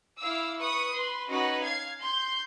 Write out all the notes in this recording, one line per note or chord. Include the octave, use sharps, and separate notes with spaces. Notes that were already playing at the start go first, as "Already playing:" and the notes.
E4 F5 D6 E6
B4 C#6 D#6
B4 C6
C#4 D#4 F#4 B4 D#5
F5 G#6 C7
C6 G6